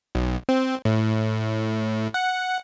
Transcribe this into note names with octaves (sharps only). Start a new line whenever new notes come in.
B1
C4
A2
F#5